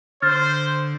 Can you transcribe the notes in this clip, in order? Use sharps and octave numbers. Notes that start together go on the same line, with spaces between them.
D3 C5 F6 A6